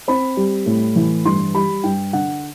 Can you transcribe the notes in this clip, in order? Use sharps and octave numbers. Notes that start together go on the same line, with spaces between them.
C4 B5
G3
A2
E3
G2 C6
G3 B5
G2 G5
D3 F#5